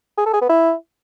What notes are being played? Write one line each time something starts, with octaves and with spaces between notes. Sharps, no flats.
G#4
A4
G#4
B3
E4